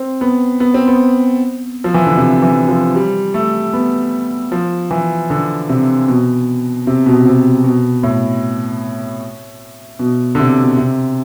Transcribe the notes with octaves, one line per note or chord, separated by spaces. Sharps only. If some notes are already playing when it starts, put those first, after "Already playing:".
Already playing: C4
B3
B3
C4
B3
F3
E3
D3
C3
E3
F3
G3
A3
B3
F3
E3
D3
C3
B2
C3
B2
C3
B2
A2
B2
D3
C3
B2
C3